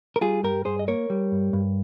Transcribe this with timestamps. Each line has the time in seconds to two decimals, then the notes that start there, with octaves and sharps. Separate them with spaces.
0.16 A#4
0.21 G3 F4 G#4
0.43 G2 G4 A#4
0.65 G2 G#4 C5
0.79 D#5
0.88 A#3 A#4 C#5
1.10 G3
1.32 G2
1.53 G2